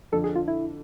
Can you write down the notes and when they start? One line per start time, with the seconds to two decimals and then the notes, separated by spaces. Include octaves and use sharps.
0.12 F2 D3 F3 A4
0.24 G#4
0.36 F4
0.48 E4